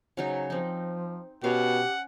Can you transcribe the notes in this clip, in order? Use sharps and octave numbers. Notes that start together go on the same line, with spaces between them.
C#3 F#3 D#4
F3 C4 D#4
B2 C#4 G4 F5 F#5